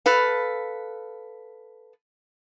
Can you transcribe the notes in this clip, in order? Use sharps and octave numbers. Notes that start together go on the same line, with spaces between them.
A4 B4 F5